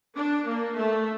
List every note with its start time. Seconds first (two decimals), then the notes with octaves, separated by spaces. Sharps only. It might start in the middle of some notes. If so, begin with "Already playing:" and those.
0.15 D4
0.45 A#3
0.75 A3